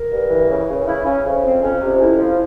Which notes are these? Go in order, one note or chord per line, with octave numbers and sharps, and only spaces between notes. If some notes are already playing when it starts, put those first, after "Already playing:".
Already playing: A#4
G2
E3
C#3
C#3
C#3 E4
C#3 C#4
F2
F3 C4
F2 C#4
C3
F2 E4
F3